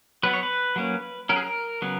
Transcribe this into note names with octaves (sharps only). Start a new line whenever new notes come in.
F#3 B3 B4
C#5
B4
F#3 A#3 C#4
F#3 C#4 A#4
G#4
A#4
C#3 F#3 B3